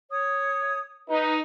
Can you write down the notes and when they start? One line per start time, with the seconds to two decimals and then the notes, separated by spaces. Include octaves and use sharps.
0.11 C#5 D#6
1.09 D#4 B4